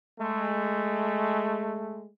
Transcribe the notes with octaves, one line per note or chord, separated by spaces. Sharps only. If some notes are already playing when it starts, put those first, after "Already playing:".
G#3 A3